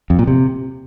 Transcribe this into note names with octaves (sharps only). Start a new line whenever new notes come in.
F2
A#2
C3